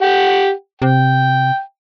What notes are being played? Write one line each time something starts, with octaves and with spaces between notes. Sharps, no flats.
G4 F#5 G5
C3 G5